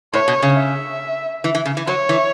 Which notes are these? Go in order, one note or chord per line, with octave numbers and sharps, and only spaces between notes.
A2 C#5
B2
C#3
E5
E3
E3
C#3
E3
F#3 C#5
E3